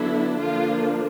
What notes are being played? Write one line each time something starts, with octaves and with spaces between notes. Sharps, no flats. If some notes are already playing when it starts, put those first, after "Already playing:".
Already playing: D3 F#3 B3 D4 E4
D3 F3 A#3 D4 F4